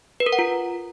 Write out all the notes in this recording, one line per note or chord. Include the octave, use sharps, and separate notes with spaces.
B4
A#4
F#5
F4